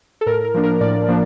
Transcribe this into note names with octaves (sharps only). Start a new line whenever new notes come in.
A4
A2 A#4
A#4
F3 A#3 D4
A#4
A2 D5
F3 A#3 D4